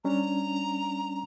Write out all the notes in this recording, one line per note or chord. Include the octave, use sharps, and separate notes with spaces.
G3 C#4 D4 A#5